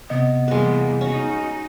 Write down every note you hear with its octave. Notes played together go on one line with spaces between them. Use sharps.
C3 B3 D#5
E2 G3 G#3 A#3 B4
C#4 D#4 F#4